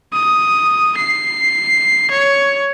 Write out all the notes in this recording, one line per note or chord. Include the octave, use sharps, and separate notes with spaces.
D#6
C7
C#5